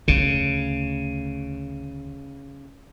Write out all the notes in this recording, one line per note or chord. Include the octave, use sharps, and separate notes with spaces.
D2 C#3 A3